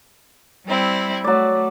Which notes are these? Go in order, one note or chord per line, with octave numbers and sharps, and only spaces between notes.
G3 C4 E4
F#3 A3 D5